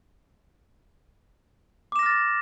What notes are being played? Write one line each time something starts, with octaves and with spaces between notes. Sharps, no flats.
D6 F6 A6 A#6 E7